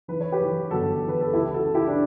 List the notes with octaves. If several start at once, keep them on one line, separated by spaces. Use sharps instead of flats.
E3 B4
C#5
G4 B4
E3
G1 F#4 A4
E3
B4
A4
C#2 E4 G4
F#4 A4
C#3
E4 G4
D4